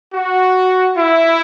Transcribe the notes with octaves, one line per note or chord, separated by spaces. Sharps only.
F#4
E4